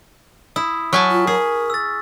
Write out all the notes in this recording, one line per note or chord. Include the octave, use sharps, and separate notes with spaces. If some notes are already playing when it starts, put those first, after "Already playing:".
E4 D#6
F#3 G#5 A5 C#6 F6 B6
F4
G#4 A#4
E6 A6